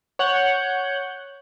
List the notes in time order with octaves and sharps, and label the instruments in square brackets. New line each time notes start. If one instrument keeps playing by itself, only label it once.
[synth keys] C#5 F#5 F#6 G6